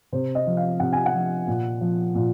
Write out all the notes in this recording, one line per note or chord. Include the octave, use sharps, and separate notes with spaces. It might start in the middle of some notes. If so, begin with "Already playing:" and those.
C3 C5
D#5
F3
F5
C3 F#5
G#5
F#5
F3
A#2
F3
A#2